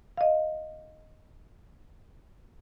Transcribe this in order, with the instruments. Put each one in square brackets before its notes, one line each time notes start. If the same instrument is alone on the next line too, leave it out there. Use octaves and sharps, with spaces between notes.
[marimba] D#5 F5